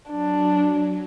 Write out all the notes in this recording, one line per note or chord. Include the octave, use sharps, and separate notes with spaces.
F#3 D4